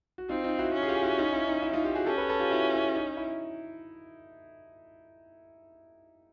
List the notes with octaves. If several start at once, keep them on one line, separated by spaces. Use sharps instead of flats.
F#4
C4 D#4 F4
D#4 F4
E4 F#4
C#4
G#4
F4 G4
E4 F#4
D#4 F4
E4
D#4
E4
D#4 F4
F4 G4
F#4 G#4
C#4 G4 A4
A4 B4
A4 B4
F4 G4
E4 F#4
E4
D#4
E4